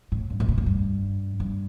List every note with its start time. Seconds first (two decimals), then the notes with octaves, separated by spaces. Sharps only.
0.12 A2
0.30 G2
0.40 A2
0.49 A#2
0.58 A2
0.66 G2
1.40 G2